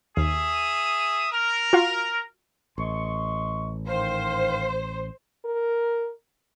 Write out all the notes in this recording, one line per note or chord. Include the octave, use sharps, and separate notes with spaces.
D#2 G#4 E5 D#6
A#4
F4 F#4 F5
A1 D#5 C6 C#6
G#2 D#3 C5 F5
A#4